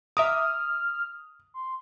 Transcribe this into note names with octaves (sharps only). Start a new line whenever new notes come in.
E5 A#5 D6 D#6 F6
C6